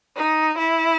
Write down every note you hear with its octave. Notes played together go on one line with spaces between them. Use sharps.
D#4
E4